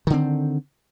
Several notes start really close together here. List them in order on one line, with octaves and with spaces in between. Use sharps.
D#3 D3 C4